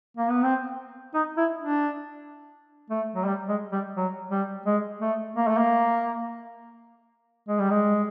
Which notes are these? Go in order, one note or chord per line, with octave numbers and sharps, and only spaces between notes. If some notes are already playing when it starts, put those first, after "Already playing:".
A#3
B3
C4
D#4
E4
D4
A3
F#3
G3
G#3
G3
F#3
G3
G#3
A3
A#3
A3
A#3
G#3
G3
G#3